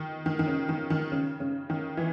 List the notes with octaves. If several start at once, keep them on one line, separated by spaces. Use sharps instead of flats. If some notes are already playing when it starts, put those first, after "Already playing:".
Already playing: D#3
D#3
D#3
C#3
D#3
D#3
C#3
C#3
D#3
E3